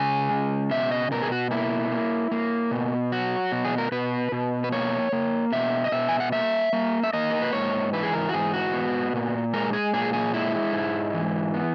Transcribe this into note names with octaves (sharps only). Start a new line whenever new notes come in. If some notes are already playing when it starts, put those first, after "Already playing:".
Already playing: C#3 G#3 G#5
C#3
B2 E5
D#5
B2 A#4
G#4
F#4
A#3 E4
A#3
A#3
B2
F#3 F#4
B2
G#4
A#4
B2 B4
B2
B4
A#3 C#5
A#3
B2 E5
D#5
B2 E5
G#5
F#5
A#3 E5
A#3
E5
A#3 D#5
A#4
B4
G#2 C#5
E3 B4
G#4
A#4
F#4
G#2 G#4
F#4
B3
A#2
G#3 A#4
G#4
A#2 G#4
G#4
G#3 E4
G#2
E3
B3